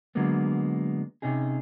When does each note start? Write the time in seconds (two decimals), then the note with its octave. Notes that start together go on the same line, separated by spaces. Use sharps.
0.15 D3 F#3 G#3 A#3 B3
1.22 C3 C#4 D#4 G#4